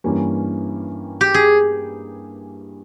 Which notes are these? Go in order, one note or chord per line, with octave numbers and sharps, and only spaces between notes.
G2 E3 G3 A#3 C#4
G4
G#4